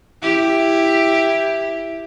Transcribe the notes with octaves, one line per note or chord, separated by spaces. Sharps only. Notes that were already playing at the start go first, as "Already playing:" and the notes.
E4 G4